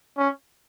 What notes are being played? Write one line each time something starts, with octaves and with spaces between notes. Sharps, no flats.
C#4